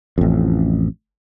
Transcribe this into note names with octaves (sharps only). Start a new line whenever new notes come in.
A1 F2